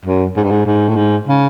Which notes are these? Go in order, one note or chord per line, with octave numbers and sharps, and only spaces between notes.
F#2
G#2
G2
G#2
G#2
A2
G#2
C#3